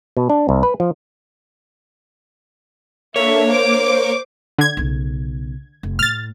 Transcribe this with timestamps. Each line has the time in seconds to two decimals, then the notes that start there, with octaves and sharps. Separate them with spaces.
0.17 B2
0.30 D4
0.49 C2
0.63 B4
0.80 F3
3.16 A#3 D4 A4 C#5 E5
3.50 C5 D6
4.58 D3 G#6
4.77 B1 C#3
5.83 F1
5.99 A2 F6 A6